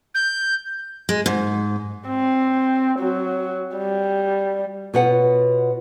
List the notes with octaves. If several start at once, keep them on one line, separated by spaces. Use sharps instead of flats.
G6
G#3
G#2
C4
F#3
G3
B2 F4 B4 C#5 F#5